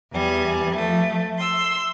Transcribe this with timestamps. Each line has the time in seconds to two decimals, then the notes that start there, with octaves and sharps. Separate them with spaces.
0.13 E2 G3 G#5
0.74 F3 A3
1.39 C6 E6